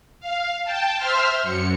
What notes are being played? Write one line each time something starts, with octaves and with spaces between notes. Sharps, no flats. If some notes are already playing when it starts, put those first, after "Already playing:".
F5
G5 A5
C5 E5 C6 F6
F#2 C#7